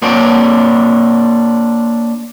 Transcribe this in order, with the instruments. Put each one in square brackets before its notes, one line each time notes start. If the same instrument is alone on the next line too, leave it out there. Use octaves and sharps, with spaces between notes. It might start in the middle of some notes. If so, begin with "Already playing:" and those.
[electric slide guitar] A#3 D4 C5 C#5 G5